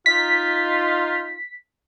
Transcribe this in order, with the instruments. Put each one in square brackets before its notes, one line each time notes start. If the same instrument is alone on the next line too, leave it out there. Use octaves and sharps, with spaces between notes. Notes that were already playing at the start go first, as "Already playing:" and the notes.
[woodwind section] D#4 F4 [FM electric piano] B6